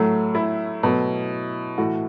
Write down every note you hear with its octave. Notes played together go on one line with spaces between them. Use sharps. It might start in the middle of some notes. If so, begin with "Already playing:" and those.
Already playing: A2 F#3 A3
E4
B2 F#3 A3
A2 E3 A3 F#4